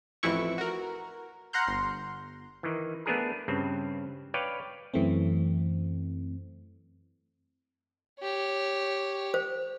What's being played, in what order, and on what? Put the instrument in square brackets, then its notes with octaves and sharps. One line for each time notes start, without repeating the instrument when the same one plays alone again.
[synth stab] A1 F2 E3 E4 C#6
F#4 A#4
F#5 A#5 C6 F6 G6
G1 C6
[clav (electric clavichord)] D#3 E3
A3 B3 D4 G#4 A#4
G2 C#3 C4
B4 C#5 D5 F5 G5
[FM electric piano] F#2 E3 A3 C4
[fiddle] G4 C#5
[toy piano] C5